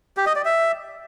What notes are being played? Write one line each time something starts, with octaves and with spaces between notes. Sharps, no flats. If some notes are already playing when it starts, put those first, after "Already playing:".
G4
D#5
D5
E5